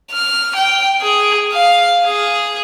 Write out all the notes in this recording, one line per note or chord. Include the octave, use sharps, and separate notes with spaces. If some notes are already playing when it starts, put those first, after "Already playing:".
F6
G5
G#4
F5
G#4